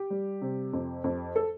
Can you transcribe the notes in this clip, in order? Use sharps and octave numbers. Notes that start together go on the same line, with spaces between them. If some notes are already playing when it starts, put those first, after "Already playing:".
Already playing: G4
G3
C3
F2
F2
A4